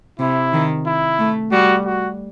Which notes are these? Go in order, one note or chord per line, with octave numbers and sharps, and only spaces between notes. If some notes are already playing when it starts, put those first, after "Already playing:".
C3 E4
D#3
E4
A3
G3 F#4
F#4